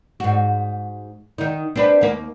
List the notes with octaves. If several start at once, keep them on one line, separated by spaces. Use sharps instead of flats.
G#2 F#4
D#3 D#4
C4 D4 B4
D#2 A#3